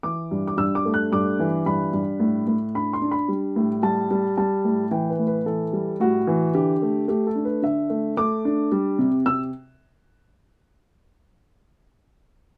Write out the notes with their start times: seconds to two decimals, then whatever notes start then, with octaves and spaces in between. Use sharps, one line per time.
0.03 E3 D6
0.31 G2
0.47 D6
0.57 G2 E6
0.75 D6
0.85 A3
0.94 F#6
1.12 G2 D6
1.39 E3
1.66 G2 B5
1.93 G2
2.20 A2
2.47 A2
2.75 D4 B5
2.93 C6
3.02 D4
3.11 B5
3.28 G3
3.56 A2
3.83 G3 A5
4.11 G3
4.37 G3 A5
4.65 A2
4.91 E3 G5
5.10 B4
5.19 A2
5.27 B4
5.46 E3 A4
5.73 G3
6.00 A2 F#4
6.27 E3
6.54 D3 G4
6.82 A3
7.08 A3 G4
7.27 A4
7.35 D4
7.45 B4
7.62 D3 E5
7.90 A3
8.17 A3 D6
8.45 D4
8.72 G3
8.99 C3
9.26 C3 E6